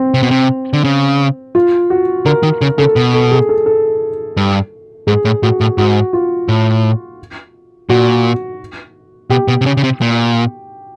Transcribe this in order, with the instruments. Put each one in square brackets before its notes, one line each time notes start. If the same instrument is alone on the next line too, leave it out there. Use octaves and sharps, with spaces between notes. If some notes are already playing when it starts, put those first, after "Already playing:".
Already playing: [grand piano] C4
[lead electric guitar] C3
B2
C3
D3
C#3
[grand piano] F4
F#4
[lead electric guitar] D3 [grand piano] A#4
[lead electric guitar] D#3
[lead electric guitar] C#3 [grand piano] A#4
[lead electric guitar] C#3 [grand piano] A4
[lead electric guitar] B2
[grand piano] A4
G#4
A4
A4
[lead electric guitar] G2
[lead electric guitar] G#2 [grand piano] G#4
[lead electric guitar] A2
[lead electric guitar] A2 [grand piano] F#4
[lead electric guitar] A2
[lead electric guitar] G#2 [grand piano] F#4
[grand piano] F4
[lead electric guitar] A2
[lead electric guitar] A#2 [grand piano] F#4
[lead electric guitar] B2 [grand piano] G4
[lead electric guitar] B2
C3
C#3
C#3
C3
A#2